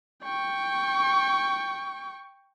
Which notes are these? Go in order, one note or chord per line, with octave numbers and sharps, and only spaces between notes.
G5 C#6